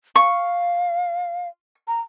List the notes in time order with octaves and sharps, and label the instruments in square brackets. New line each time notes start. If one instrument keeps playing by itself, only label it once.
[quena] F5 [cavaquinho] C#6
[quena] A#5